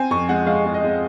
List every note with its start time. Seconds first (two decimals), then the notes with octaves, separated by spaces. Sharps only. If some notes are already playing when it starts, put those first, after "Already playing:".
Already playing: C4 G#5
0.11 F2 C#6
0.29 G#3 F#5
0.46 G#3 F5
0.66 G#3
0.74 D#5
0.84 G#3